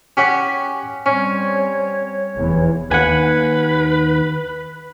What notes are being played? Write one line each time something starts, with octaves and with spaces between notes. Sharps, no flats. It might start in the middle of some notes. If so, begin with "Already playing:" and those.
C#4 G4 F#5
G3 C4 C#4 C#5
F1 E2 E3
D#2 B4 F#5 G#5